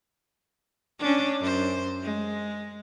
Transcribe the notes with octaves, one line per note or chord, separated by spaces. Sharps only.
C#4 D4
F#2 C5
G#3